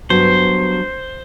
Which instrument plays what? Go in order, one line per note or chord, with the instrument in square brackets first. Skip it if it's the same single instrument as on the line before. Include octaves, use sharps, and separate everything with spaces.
[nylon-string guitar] G2 F#3 B3 [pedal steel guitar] C5